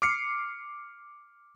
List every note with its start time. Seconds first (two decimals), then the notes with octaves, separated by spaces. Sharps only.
0.02 D6 F6 C7 C#7